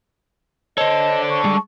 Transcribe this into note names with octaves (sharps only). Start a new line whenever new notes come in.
D4 A4 C5 C#5 D#5
C#6
G3 G#3